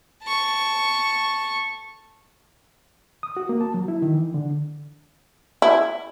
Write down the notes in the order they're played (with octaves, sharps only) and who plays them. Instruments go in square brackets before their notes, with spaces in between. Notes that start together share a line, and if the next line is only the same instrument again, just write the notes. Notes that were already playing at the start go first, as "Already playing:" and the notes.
[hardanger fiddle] A5 C#6
[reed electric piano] D#6
F#4
A#3
A5
F#3
E4
D#3
E3
D3
[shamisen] E4